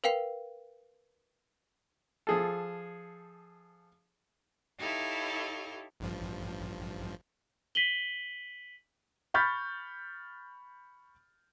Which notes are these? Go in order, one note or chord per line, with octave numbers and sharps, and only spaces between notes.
A#4 B4 F5 G5 C7 F7
F3 G#4 A4
D#4 E4 G4 A4 C#5 F5
A1 G2 F3
B6 D#7 F#7 G7
B5 C#6 F6 G6 A6 B6